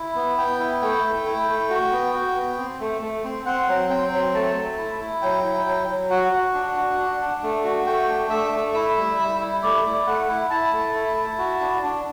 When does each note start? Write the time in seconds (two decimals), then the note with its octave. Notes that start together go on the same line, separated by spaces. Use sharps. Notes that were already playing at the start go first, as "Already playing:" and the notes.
Already playing: E4
0.15 B3
0.38 B3 G5
0.60 E4
0.82 A3 G5
1.04 A3
1.26 E4
1.48 A3
1.70 F#4
1.92 B3
2.14 F#4
2.36 B3
2.58 C4
2.80 A3
3.01 A3
3.24 C4
3.46 C4 F#5
3.69 F#3
3.90 C4 G5
4.12 F#3
4.34 A3 A5
4.56 A3
4.78 E4
5.00 E4
5.22 F#3 G5
5.44 E4
5.67 F#3
5.89 F#3
6.10 F#4 F#5
6.32 F#4
6.54 D4
6.76 F#4
6.99 D4
7.21 D4
7.43 A3
7.64 F#4
7.86 A3 G5
8.09 D4
8.30 A3 E5
8.52 A3
8.74 E4 E5
8.97 G3
9.18 G3
9.40 E4
9.63 A3 D5
9.85 E4
10.06 A3 F#5
10.29 E4
10.50 E4 A5
10.73 A3
10.94 E4
11.17 E4
11.38 F#4
11.61 D4
11.83 D4